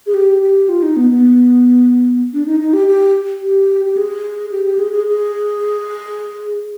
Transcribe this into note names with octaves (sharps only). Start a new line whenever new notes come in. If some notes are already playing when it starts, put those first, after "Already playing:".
G#4
G4
G4
F4
D#4
B3
B3
D4
D#4
D#4
G4
G4
G4
G4
G#4
G4
G4
G#4
G#4
G#4